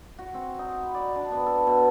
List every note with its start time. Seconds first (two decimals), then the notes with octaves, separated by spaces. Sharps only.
0.19 F#4
0.34 C4
0.59 D#4
0.83 B5
0.94 D5
1.16 D4
1.32 B3
1.46 A4
1.67 B2